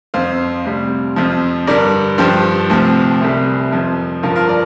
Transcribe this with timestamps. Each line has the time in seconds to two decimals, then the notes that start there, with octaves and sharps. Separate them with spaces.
0.14 F2 F3 C5 F5
0.65 D2 C3 G3
1.16 F2 F3
1.67 G2 D3 G3 A#4 D5
2.18 G2 F3 G4 C5
2.70 D2 C3 F3
3.21 C2 C3 G3
3.72 F2 F3
4.23 G2 D3 F3 F4 A#4
4.36 F4 A#4
4.49 A#4 D5